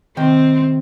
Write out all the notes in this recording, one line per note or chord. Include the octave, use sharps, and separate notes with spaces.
C3 D#3 C4 G5